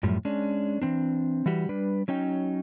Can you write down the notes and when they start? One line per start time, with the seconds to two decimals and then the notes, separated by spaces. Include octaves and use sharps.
0.03 F#2 A2 F3 G3
0.25 G#3 C#4 D4
0.82 E3 C4 D4
1.46 E3 G3 F#4 G4
1.69 G3 D4 B4
2.08 F#3 C#4 D#4 G5